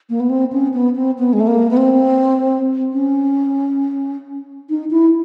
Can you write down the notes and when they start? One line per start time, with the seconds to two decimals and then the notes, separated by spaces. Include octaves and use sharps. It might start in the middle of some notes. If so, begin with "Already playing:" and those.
0.10 A#3
0.20 B3
0.30 C4
0.52 C#4
0.74 B3
0.96 C4
1.18 B3
1.33 G#3
1.40 A3
1.47 A#3
1.71 B3
1.77 C4
2.94 C#4
4.70 D#4
4.91 E4